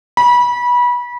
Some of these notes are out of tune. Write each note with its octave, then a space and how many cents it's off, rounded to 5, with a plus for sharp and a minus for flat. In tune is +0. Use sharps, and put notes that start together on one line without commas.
B5 -25